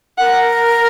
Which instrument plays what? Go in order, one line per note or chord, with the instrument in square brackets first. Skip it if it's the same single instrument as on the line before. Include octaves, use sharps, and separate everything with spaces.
[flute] A#4 [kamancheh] F#5